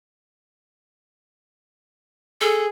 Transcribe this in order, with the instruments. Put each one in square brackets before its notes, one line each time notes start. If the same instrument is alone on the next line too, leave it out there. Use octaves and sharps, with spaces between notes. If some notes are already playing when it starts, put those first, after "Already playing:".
[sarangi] G#4 [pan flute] A4